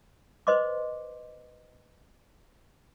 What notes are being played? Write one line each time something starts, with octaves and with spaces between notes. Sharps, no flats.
B4 C5 D#5 C6 D6